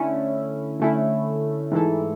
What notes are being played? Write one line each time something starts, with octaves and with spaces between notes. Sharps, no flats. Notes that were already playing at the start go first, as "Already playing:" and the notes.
Already playing: D3 A3 C#4 E4
D3 A3 C#4 E4
G#2 E3 A3 E4 A4